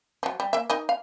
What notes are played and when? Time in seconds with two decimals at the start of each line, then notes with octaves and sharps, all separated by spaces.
0.23 F3 F#3
0.40 G3
0.53 A#3 E5
0.70 D#4 A#4 D#5
0.89 F5